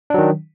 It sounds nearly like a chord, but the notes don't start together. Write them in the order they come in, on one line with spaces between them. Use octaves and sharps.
D4 F#3 D#3